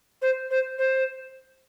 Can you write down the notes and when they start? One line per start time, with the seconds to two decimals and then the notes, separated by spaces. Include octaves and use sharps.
0.21 C5
0.50 C5
0.78 C5